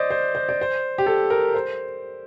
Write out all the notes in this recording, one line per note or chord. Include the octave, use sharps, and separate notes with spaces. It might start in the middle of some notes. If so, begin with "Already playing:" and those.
Already playing: C5 D5 D#5
C5
C5
D5
C5
G4
A4
A#4
C5